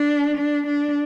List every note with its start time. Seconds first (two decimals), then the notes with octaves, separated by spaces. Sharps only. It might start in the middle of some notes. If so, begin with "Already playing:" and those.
Already playing: D4
0.37 D4
0.67 D4